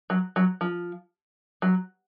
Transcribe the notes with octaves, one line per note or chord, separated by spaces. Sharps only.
F#3
F#3
F3
F#3